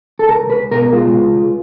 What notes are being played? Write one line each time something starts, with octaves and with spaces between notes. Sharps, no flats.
A4
C#2 A#4
C#2 B4
B2 A#4
G#3 F4
C#2
C#2